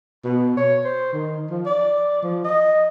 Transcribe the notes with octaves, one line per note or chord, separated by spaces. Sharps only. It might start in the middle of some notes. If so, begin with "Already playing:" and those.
B2
C#5
C5
D#3
F3
D5
F3
D#5